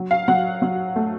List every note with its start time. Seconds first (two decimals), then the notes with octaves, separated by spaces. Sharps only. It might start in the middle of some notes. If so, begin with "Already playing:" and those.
Already playing: F#3
0.11 F5
0.28 F#3 F#5
0.62 F#3
0.96 A3